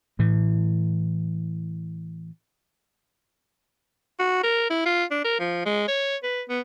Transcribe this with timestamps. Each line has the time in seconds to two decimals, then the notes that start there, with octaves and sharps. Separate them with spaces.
0.19 A2 E3
4.19 F#4
4.43 A#4
4.70 E4
4.86 F4
5.11 D4
5.24 A#4
5.40 F3
5.66 G#3
5.88 C#5
6.23 B4
6.49 B3